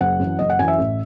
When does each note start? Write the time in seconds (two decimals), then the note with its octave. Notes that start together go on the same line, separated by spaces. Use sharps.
0.01 F#1 F#5
0.19 F#2 E3
0.39 F#1 D#5
0.50 F#5
0.59 F#2 E3 G#5
0.68 E5
0.78 A1